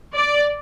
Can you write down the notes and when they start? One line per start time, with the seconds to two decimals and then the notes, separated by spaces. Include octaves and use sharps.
0.15 D5